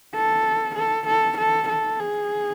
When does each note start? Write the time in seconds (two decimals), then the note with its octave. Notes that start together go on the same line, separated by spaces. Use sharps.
0.15 A4
0.76 A4
1.08 A4
1.38 A4
1.69 A4
2.00 G#4